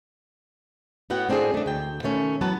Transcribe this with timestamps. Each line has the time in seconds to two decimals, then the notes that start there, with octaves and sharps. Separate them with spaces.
1.10 A2 B3 F#4 F#5 G5
1.29 A2 C4 D4 F#4 G#4
1.54 A3 D4
1.66 D2 G5
2.03 B2 D#3 A3 C#4
2.41 E3 F#3 B3 B4 A5